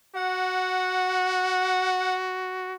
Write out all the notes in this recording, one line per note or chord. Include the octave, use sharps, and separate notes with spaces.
F#4 F#5